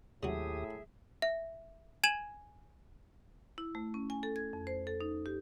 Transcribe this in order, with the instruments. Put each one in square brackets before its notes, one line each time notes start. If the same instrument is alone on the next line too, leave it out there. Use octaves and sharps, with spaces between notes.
[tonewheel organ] D#2 G4 D#6 [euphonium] A2 [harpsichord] C#3 F#3 [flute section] G#4 E5
[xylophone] E5
G#5 G#6 D#7 E7 F#7
[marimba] E4
A3
C#4
G#5
A4
G#6
F2
C5
A4
D#4
G4